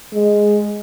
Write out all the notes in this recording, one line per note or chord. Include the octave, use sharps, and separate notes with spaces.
G#3